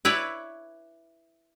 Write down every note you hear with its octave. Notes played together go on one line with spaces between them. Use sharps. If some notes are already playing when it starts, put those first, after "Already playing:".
E4 B4 C#5 D5 E5